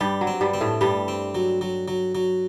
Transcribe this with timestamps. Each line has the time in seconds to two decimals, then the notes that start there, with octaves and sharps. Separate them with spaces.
0.01 G2 G3 G4
0.21 F#3
0.27 C4
0.41 G2 G3
0.54 C4
0.61 A2 A3
0.81 G2 G3 G4
1.08 C4
1.35 F#3
1.61 F#3
1.88 F#3
2.15 F#3